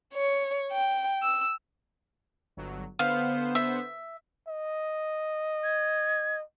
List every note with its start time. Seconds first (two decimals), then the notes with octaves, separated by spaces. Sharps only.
0.14 C#5
0.72 G5
1.22 E6
2.57 G1 F#3
2.99 D3 B3 C5 F5
3.55 E5
4.48 D#5
5.64 G#6